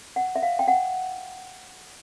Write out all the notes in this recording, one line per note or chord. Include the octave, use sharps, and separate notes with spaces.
F#5
E5
F5
G5
F#5